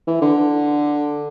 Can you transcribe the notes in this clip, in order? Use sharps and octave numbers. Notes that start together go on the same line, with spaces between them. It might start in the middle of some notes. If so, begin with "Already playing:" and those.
E3
D3